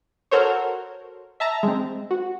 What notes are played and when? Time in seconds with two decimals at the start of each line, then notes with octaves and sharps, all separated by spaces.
0.31 F#4 A4 A#4 C5 C#5
1.40 E5 A5 A#5
1.63 G#3 C4
2.11 F#4